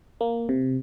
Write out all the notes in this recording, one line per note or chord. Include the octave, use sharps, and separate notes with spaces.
A#3
C3